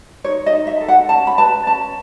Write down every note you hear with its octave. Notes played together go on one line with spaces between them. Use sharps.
D#4 C#5
D#5
D#4
E5
A4
F#5
C#4 A5
B5
B4 A5
C#4 A5